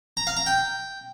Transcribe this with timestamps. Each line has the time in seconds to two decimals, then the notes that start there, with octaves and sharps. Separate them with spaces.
0.17 A#5
0.27 F5
0.37 A#5
0.46 G5